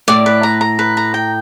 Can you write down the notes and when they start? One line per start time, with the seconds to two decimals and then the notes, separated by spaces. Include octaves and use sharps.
0.08 A2 D5
0.26 B4
0.43 A#5
0.61 A#5
0.79 B4
0.97 A#5
1.14 G5